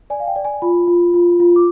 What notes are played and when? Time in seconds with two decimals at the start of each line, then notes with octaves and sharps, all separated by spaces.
0.10 D5 G#5
0.20 F5
0.27 G5
0.36 D5
0.45 G#5
0.62 F4 B5
0.87 F4
1.14 F4
1.40 F4
1.56 D6